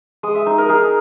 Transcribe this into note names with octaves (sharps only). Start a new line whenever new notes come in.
G#3 D#6
E5
D#4 D#5
A#4
D#4 G#4